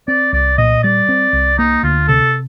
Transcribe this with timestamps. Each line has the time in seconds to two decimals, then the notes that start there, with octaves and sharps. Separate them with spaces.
0.08 C4 D5
0.33 C2 D5
0.58 A#2 D#5
0.83 G3 D5
1.09 C4
1.33 C2
1.59 A#3 D#4
1.83 D2 F4
2.08 C3 A4